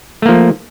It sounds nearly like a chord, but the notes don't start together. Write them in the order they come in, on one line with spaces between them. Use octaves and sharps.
A3 A#3 F3